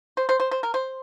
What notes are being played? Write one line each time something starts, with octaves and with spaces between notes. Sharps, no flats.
C5
C5
C5
C5
A#4
C5